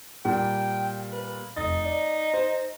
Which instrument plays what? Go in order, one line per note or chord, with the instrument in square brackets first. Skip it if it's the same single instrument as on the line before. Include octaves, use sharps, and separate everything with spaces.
[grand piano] A#2 G3 [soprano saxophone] G5
[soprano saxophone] B4
[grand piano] F1 D#6 A6 [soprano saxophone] D#4
[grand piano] D5
C5